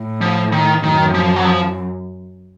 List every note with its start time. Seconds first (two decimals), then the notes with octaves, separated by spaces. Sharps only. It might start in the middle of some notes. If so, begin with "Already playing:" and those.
Already playing: A2
0.21 F3
0.52 D#3
0.83 F#2 D#3
1.14 F3
1.36 F#3
1.45 F3